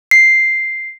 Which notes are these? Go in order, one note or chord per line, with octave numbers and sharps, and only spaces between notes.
C7